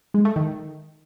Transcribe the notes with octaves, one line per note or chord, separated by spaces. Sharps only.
G#3
A3
D#3